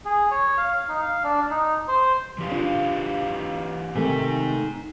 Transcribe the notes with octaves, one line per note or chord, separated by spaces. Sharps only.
G#4
C#5
F5
D#4
F5
D4
D#4
C5
E3 G4 F5
D4 F4
C3 D#3 A3 D#4 G#5